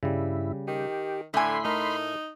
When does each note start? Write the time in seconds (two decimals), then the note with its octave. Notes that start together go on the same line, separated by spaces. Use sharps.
0.03 G2 C#3 G3 E4
0.68 D#3 G4
1.34 A2 D3 E5 G#5 B5 C6
1.64 A3 D#4 A#4